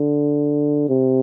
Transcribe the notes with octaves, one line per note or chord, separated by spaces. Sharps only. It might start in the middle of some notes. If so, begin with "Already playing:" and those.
Already playing: D3
C3